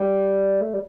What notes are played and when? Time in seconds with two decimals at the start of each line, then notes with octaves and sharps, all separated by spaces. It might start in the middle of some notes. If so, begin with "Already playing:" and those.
Already playing: G3
0.61 A3
0.73 G3